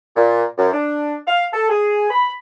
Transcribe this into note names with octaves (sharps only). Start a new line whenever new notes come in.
A#2
F#2
D4
F5
A4
G#4
B5